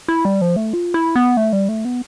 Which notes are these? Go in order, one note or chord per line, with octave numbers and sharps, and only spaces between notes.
E4
G3
F3
A3
F4
E4
B3
A3
G3
A3
B3